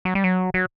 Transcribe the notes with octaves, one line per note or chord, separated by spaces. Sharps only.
F#3
G3
F#3
F#3